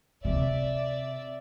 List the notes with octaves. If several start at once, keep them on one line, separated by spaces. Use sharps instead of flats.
C3 D5 E5